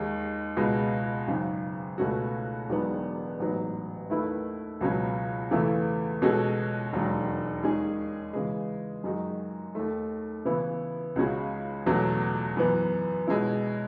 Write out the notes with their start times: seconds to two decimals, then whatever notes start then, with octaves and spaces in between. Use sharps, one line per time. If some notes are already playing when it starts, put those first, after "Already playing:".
Already playing: D#2 D#3 G#3
0.57 C#2 B2 G#3
1.28 G#1 F#2 C#3
1.98 C#2 B2 A3 C#4 F#4
2.69 E1 E2 D#3 F#3 B3
3.40 A1 G#2 F#3 B3
4.10 D#2 D#3 A3 E4 B4
4.81 C#2 B2 F#3 C#4
5.51 E2 C#3 E3 A3 E4
6.22 B2 G#3 C#4 F#4 A4
6.93 E1 D#2 D#3 F#3
7.63 D#2 D#3 G#3 C#4 G#4
8.33 C#3 E3 G#3
9.04 F#2 D#3 G#3 D#4 F#4
9.75 D#2 D#3 A3
10.45 C#3 E3 B3 E4
11.16 C#2 C#3 G#3 C#4 F#4
11.86 E2 B2 F#3 A3 C#4
12.57 F#2 E3 B3
13.27 B2 G#3 C#4 E4